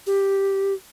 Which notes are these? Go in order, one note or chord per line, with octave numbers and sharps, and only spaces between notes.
G4